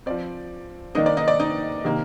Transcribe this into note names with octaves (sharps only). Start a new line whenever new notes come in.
F3 C4 D5
D#3 A#3 D4 D#4 D#5
D5
D#4 D#5
D5
D#4 D#5
C3 D#3 A#3